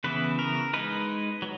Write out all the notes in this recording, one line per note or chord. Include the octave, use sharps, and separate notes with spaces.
C#3 E3 B3 E4 B4
A#4
G#3 D#4 B4
F#3